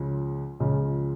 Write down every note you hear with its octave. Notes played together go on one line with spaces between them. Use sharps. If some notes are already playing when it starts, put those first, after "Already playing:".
Already playing: C#2 C#3 F3
C#2 C#3 F3